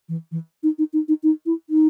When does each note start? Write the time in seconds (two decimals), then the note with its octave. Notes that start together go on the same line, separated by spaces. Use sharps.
0.09 E3
0.32 E3
0.63 D#4
0.78 D#4
0.93 D#4
1.08 D#4
1.23 D#4
1.46 E4
1.70 D#4